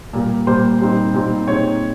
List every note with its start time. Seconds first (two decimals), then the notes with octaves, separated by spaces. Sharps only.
0.13 A#2 G3 A#3
0.47 A#2 G3 A#3 C5
0.80 A#2 G3 C4 D#4
1.14 A#2 G3 C4 D#4
1.48 A#2 G#3 C4 D#4 C#5